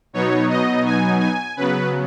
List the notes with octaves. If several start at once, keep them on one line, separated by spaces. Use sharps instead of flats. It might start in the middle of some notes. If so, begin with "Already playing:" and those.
B2 F#3 B3 D#4 C#5
D#5
G#5
G#5
C#3 F#3 B3 B4